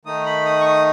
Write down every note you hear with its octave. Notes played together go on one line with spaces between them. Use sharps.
D#3 A3 D#4 D#6
B5
D#6
C#6
D#6